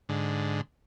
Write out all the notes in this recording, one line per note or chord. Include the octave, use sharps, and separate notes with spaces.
G#2 D3